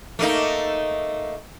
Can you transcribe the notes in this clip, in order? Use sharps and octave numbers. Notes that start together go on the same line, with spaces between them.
A3 A#3 D#4